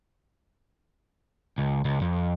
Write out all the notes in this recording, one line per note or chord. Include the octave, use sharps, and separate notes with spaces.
C#2
C#2
F2